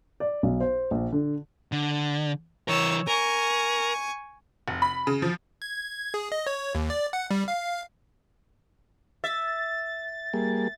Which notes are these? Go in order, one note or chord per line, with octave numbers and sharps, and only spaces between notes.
D5
B1
C5
A#1
D3
D3
E3 A#4 C#5 E6
A#4 G#5 C#6
F1
B5
C#3
F3
G#6
G#4
D#5
C#5
D#2
D5
F#5
G3
F5
E5 A6
G3 A#3 G#4